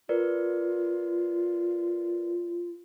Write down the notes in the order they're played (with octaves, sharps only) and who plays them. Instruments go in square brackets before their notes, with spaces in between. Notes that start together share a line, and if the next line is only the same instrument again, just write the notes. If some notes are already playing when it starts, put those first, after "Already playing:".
[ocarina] F4 [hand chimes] A#4 B4 D5